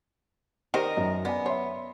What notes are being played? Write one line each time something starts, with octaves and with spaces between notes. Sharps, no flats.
D#3 G4 A#4 C5 D#5
F#2
B3 D5 G#5
C#5 E5 C6